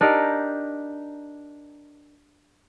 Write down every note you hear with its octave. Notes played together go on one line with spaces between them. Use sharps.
D4 D#4 G4 A#4